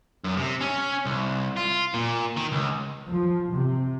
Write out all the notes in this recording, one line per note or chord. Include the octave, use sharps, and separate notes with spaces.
F#2
C3
C#4
C2
F4
A#2
D#3
C#2
F3
C3